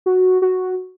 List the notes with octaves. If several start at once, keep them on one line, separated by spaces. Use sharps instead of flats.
F#4
F#4